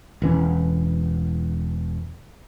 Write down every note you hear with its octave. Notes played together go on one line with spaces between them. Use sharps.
E1 E3 C#4